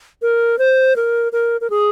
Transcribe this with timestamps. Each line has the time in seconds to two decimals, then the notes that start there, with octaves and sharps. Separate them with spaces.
0.22 A#4
0.59 C5
0.96 A#4
1.32 A#4
1.61 A#4
1.70 G#4